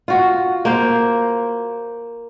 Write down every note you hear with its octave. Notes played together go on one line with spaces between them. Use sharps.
F4 F#4
A#3 C5